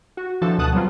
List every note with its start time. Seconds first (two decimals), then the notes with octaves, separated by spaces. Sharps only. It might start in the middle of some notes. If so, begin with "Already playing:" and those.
0.17 F#4
0.42 E3 F3 D4 F#4 A4 A5
0.58 D2 B2 A5 D#6 F#6
0.73 F#3 G3 B3 C4 F4